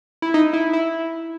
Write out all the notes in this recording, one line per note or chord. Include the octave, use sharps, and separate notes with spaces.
E4
D#4
E4
E4